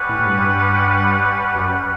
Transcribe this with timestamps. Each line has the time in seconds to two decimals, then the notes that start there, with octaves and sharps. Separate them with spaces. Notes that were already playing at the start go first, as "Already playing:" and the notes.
Already playing: G3 C#4 G4 B4 F#5
0.09 A2
0.19 A2
0.26 G2
1.55 F#2